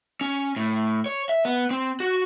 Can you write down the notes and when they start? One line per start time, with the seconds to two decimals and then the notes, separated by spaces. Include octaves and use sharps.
0.21 C#4
0.56 A2
1.06 C#5
1.29 E5
1.45 B3
1.71 C4
2.00 F#4